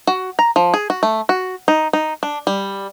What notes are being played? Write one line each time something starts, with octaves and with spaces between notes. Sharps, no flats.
F#4
A#5
F3
G#4
F#4
A3
F#4
D#4
D#4
D4
G3